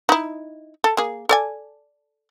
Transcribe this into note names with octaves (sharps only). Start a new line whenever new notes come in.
D#4 E4
A4
A#3 G#4
A4 D5 G#5